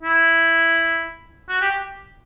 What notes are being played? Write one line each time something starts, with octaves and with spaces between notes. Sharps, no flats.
E4
F#4
G4